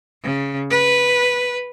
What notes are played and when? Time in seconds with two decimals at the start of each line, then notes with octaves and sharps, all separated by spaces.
0.23 C#3
0.71 B4